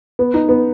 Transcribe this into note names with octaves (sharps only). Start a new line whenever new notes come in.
B3
D#4
B3